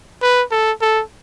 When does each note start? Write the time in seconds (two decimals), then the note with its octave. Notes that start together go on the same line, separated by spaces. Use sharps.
0.22 B4
0.51 A4
0.81 A4